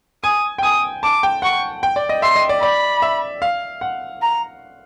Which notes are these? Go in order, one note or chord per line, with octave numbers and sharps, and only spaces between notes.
G#5 D#6
G5
G#5 D#6
A5 D6
G5
F#5 C#6
G5
D5
D#5
E5 C6
D#5
D5
D5 B5
E5
F5
F#5
A#5